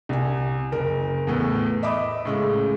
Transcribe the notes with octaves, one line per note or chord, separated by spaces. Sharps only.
C2 G#5
F#1 A#4
E2 A2 B3
D#5 E5 B5 D6 D#6
A2 C#3 G#3